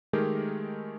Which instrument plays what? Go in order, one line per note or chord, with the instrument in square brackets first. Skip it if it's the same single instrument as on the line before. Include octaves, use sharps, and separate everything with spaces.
[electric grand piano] D#3 G#3 A3 G4 G#4 A#4